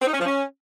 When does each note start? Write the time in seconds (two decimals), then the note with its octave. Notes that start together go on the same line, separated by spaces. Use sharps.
0.01 C4
0.07 D#4
0.13 C#4
0.19 F3
0.26 C#4